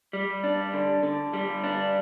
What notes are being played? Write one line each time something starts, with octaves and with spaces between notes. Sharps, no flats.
G3
D4
D3
D3
G3
D4